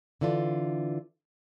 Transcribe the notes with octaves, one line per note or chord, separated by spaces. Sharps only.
D3 E3 D4 F4